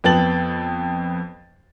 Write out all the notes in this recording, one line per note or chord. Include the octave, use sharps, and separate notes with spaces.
F2 B3 G5 A5 A6 F#7